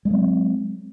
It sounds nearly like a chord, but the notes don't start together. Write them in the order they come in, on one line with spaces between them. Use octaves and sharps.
G#3 A3 F#3 C4